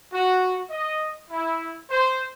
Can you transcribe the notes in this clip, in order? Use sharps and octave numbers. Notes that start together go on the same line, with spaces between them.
F#4
D#5
E4
C5